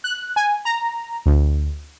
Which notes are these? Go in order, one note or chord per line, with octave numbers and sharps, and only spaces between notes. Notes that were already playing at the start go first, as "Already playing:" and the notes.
F#6
G#5
A#5
D2